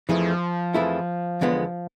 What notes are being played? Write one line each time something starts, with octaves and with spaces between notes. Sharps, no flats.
F2 E3 F3 A3 E4 G#4
F2 E3 A3 E4 G#4
E2 D3 G#3 B3 F4